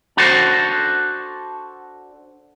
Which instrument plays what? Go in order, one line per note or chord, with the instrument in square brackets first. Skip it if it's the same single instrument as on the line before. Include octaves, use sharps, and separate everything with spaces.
[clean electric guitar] D4 F#4 A4 C5